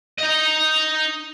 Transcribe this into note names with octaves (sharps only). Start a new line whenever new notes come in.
D#4 D#5